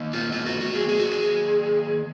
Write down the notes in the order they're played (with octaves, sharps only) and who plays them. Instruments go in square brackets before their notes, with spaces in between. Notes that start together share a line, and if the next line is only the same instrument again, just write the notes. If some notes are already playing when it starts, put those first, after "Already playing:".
Already playing: [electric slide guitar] D#3 A#3
F4
F4
F#4
F#4
G#4
G#4
F#4
G#4